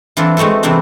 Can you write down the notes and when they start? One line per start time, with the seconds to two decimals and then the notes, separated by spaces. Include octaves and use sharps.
0.17 E3 C4 D4 F4 A4
0.37 G#3 A3 C4 F#4 A4
0.63 C3 E3 A3 B3 C4 D4